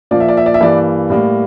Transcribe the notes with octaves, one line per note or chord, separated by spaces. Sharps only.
A#2 F3 A#3 D5
E5
D5
E5
D5
E5
G2 E3 A#3 D5
A2 G3 A#3